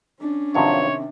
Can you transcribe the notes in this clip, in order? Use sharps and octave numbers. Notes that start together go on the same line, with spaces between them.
C#4 D4
G2 C3 D#3 F3 F#3 C#5